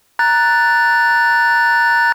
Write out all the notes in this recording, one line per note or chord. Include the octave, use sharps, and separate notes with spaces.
A#5 F#6 A6